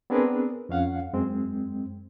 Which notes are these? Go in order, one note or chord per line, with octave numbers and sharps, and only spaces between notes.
B3 C4 D4 G#4 A#4 B4
F2 C#4 F5 F#5
F#2 G#3 C4